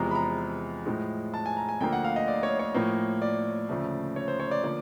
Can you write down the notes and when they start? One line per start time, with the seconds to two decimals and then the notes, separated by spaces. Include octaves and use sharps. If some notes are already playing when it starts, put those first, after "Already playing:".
Already playing: E2 C3 F3 G#3 A#5
0.11 B5
0.15 A#5
0.86 A2 F3 G#3
1.34 A5
1.46 G#5
1.57 A#5
1.69 G#5
1.81 D2 D3 F3 A#3 G5
1.93 F#5
2.04 F5
2.16 D#5
2.28 D5
2.43 C#5
2.59 C#5
2.74 A2 F3 A#3
3.22 D5
3.69 D2 C#3 F3 A3
4.16 C#5
4.28 C5
4.40 C#5
4.51 D5
4.63 D3 F3 A#3 D5